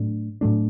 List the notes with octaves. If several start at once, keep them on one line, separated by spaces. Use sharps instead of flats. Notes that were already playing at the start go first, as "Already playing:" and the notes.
Already playing: A2 F#3 A3 D4
A2 F#3 A3 D4